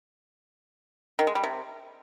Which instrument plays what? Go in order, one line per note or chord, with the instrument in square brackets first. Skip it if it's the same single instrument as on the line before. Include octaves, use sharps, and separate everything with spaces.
[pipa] D#3
G#3
G3
C3